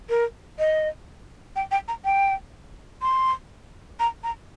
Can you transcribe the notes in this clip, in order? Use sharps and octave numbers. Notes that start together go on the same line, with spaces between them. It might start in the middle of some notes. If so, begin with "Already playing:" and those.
A#4
D#5
G5
G5
A#5
G5
C6
A#5
A#5